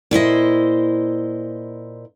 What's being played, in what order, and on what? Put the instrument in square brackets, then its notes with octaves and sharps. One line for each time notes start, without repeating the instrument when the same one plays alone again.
[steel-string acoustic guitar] A#2 E4 C5 D#5